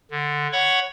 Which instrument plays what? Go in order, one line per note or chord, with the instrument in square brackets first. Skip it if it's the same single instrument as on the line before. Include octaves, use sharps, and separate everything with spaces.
[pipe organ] D3
C#5 F#5 B5 C#6